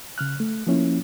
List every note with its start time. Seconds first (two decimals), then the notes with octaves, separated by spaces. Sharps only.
0.18 C#3 F6 F#6
0.40 A3
0.67 F3 A#3 C#4 E4